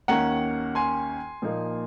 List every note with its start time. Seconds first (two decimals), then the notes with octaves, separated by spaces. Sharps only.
0.08 D#2 D#3 A#3 C#4 F#5 A#5
0.75 G#5 C6
1.42 A#2 F3 A#3 D#4